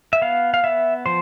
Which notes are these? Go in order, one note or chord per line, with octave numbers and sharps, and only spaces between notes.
E5
B3 F5
F5
B3 E5
F3 C5